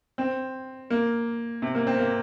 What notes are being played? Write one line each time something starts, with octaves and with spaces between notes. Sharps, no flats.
C4
A#3
C3
A#3
C4
A#3